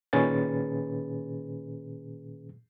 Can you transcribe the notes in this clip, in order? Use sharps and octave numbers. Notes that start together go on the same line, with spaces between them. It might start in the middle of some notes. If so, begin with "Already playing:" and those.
A#2 D#3 C#4 G#4 B4 A6